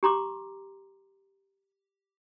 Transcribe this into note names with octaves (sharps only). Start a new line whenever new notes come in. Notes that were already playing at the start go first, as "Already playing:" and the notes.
G4 A#5 C6 D6